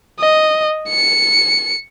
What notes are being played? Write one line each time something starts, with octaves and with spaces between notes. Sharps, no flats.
D#5
C#7